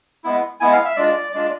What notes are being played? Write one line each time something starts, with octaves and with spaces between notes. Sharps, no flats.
G#3 B3 E4
G#3 B3 E4 G#5
F5
E5
G#3 D4 F4 D5
G#3 D4 F4 D5